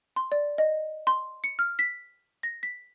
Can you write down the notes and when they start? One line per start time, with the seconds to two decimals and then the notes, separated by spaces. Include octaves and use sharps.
0.16 C6
0.32 D5
0.58 D#5
1.07 C6
1.44 C#7
1.59 F6
1.79 B6
2.43 A#6
2.63 B6